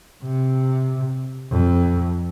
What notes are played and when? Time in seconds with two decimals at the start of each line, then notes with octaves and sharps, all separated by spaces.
0.24 C3
1.52 F2